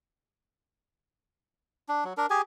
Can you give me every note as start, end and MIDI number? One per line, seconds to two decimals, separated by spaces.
1.89 2.04 62
2.04 2.13 54
2.17 2.26 62
2.17 2.26 70
2.30 2.42 67
2.30 2.42 68
2.30 2.42 80